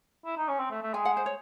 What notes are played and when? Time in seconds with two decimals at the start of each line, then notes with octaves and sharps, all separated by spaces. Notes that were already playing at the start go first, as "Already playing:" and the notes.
0.26 E4
0.37 D#4
0.48 C#4
0.60 C4
0.71 A3
0.83 A3
0.93 G#3 G#5
1.05 F#5
1.17 C5
1.26 C#5